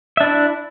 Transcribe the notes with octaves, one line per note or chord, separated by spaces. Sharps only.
D4 E4 E5